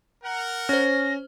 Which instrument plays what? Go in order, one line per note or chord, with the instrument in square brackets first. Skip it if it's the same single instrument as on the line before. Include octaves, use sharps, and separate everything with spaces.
[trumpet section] A#4 F#5
[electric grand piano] C#4 [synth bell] C5 F6 [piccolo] A#6